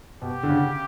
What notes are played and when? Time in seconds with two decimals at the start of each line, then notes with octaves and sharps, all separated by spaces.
0.22 B2 G4
0.43 D3
0.49 C#3